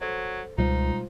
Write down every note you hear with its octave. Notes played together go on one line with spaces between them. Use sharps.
F#3 A4 C5
C#2 B2 G3 G#3 D#4 F4 C5